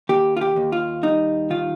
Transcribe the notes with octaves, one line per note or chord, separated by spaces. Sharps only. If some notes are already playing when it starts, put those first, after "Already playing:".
D#2 G4
F4
G4
D#2
F4
G3 D#4
D#3 F4